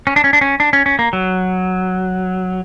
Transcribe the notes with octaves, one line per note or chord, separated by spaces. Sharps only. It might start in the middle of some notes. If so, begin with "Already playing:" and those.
C#4
D4
C#4
D4
C#4
D4
C#4
C#4
A#3
F#3